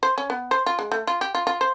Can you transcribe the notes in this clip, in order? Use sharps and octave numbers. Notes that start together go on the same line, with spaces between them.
C5
C#4
B3
C5
F4
G#3
A3
F4
G4
F4
F4
C5